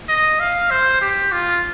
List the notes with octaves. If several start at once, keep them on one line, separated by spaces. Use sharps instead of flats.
D#5
F5
C5
G4
F4